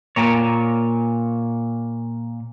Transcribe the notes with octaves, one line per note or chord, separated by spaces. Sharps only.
A#2 A#3 C#5